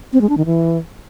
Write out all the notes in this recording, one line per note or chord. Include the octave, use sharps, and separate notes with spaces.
C4
G#3
D4
D#3
E3